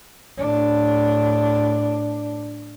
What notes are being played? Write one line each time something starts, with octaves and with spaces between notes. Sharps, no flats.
A2 D4